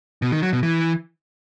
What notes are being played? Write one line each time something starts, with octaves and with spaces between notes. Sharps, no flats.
B2
D#3
F#3
B2
E3